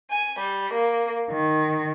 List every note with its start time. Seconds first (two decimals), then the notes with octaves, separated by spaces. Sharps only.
0.10 G#5
0.39 G3
0.73 A#3
1.30 D#3